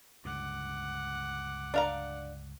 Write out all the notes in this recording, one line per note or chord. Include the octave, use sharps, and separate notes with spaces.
C#2 G2 D3 F#5 D6
D4 F5 A#5